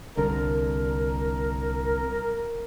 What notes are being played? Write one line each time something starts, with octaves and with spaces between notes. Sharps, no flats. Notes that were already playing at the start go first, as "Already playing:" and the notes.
C2 D3 A#4